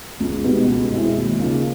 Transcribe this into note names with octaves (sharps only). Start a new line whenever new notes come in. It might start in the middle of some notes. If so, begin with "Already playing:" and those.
C#2
B2 G3 B3 D#4
C#2
B2 G#3 C4 E4
D#2
C#3 F3 A#3 D#4